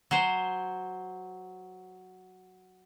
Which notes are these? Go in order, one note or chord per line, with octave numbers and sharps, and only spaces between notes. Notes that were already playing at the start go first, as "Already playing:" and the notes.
F#3 C5